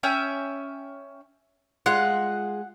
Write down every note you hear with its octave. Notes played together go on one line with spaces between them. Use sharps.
C#4 E5 G5
G#3 F4 F#5